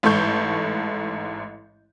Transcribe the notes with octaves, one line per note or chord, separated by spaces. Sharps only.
A1 G#2 A4 C#6 G6